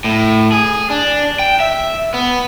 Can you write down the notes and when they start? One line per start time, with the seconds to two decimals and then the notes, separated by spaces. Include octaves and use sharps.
0.04 A2
0.52 G#4
0.90 D4
1.39 G5
1.60 E5
2.14 B3